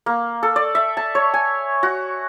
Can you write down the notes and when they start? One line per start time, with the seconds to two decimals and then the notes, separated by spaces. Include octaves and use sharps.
0.06 A#3
0.43 A4
0.56 D5
0.75 E5
0.97 A5
1.15 C#5
1.34 G#5
1.83 F#4